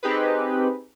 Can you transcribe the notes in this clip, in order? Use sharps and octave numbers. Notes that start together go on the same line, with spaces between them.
C4 D#4 G4 G#4 B4